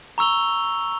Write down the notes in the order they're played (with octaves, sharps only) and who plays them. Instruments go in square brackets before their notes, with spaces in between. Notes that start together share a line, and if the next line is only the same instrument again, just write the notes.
[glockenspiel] A#5 C#6 E6 F7 G7